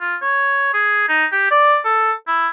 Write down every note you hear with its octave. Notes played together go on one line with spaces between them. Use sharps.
F4
C#5
G#4
D#4
G4
D5
A4
E4